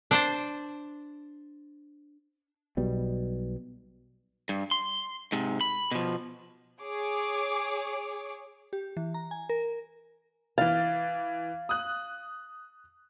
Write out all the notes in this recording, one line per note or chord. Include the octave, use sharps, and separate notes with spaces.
D4 C5 A5
B1 B2 G3
G2
C6
G#2 C3
B5
B2 F3
G#4 C#5 D6
G4
E3
A#5
G#5
A#4
E3 F5 A6
D#6 F#6